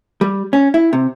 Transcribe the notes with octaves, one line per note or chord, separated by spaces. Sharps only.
G3
C#4
E4
C3